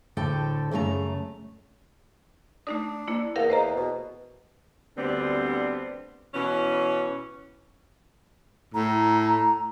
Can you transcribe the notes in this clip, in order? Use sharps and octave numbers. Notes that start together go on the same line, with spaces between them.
D2 A2 D3 A4 G5
F#2 C#3 A3 B4 A#5
A3 D4 D#4 D#6
A#3 E4
E2 A#4 F5 F#5
E2 C5 D#5 A#5
B2
D2 D3 G3 B3 C4
B2 E3 C#4
A2 A#5